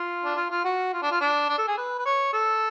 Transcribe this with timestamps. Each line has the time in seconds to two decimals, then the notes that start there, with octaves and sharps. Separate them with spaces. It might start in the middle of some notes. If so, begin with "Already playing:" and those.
Already playing: F4
0.25 D4
0.36 F4
0.50 F4
0.65 F#4
0.93 F4
1.02 D4
1.11 F4
1.21 D4
1.49 D4
1.58 A4
1.68 G#4
1.77 B4
1.99 B4
2.06 C#5
2.33 A4